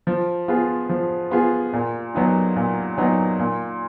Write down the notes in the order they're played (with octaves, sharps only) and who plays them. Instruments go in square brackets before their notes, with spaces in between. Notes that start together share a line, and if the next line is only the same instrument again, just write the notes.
[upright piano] F3
B3 F4 G#4
F3
B3 F4 G#4
A#2
F#3 B3 D#4
A#2
F#3 B3 D#4
A#2